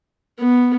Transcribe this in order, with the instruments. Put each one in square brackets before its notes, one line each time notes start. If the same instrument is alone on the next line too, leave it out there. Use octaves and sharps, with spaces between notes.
[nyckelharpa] B3